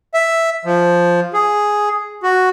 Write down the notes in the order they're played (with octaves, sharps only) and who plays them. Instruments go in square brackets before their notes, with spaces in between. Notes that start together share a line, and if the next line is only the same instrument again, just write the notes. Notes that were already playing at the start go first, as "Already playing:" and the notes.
[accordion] E5
F3
G#4
F#4